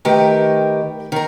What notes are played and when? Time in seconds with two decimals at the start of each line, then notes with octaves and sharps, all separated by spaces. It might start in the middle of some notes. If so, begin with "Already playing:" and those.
0.05 D#3 A3 G4 A#4 B4
1.12 D#3 A#4